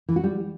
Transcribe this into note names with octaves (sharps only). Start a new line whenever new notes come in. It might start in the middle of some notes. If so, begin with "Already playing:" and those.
E3
F#4
G3